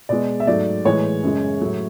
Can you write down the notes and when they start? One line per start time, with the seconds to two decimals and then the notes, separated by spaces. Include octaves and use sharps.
0.09 B2 G#3 D5
0.40 E5
0.47 G#2 F#3 A3 D5
0.85 A2 E3 G#3 C#5
1.23 F#2 C#3 G#3
1.60 A2 F#3 A3